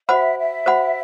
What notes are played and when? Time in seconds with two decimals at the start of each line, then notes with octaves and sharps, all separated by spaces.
0.09 F#4 C5 E5 F#5 B5
0.37 E5
0.66 F#4 C5 F#5 B5